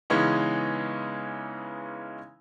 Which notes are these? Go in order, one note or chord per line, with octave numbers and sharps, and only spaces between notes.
C#3 E3 G#3 B3 C#4 D#4